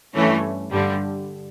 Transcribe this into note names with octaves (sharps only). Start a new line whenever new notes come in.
G2 E3 A3 C#4
G2 D3 G3